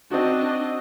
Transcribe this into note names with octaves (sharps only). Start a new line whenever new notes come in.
C4 D4 D#4 F#4 D#5